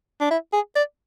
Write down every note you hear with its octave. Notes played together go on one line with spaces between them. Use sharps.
D4
E4
G#4
D5